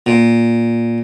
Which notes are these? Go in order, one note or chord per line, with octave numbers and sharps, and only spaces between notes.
A#2